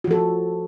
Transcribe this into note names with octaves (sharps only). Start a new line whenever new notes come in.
F3 F#4 A4